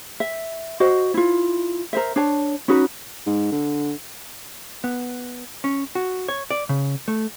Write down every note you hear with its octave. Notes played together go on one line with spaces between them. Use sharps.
E5
F#4 C5 D#5
E4 F4
A#4 C5 E5
D4 C#5 A5
C#4 D#4 F#4 B4
G#2
D3
B3
C#4
F#4
C#5
D5
C#3
A3